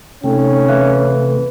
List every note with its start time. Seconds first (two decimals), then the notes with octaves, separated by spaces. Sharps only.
0.24 C3 A3 C#4 D#4 G5
0.68 E3 E5 F5 F#6